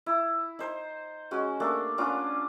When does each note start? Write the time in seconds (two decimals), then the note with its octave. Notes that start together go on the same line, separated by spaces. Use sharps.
0.06 E4
0.59 D#4 C5
1.31 G#3 C#4 F#4
1.60 A3 A#3 D4 G4
1.98 B3 C#4 D4 F4